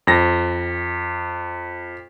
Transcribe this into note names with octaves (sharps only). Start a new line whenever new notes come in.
F2 A#6